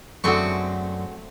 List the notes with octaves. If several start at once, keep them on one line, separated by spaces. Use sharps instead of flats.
F#2 D3 F#3 G#3 A3 C4 F#4 C#6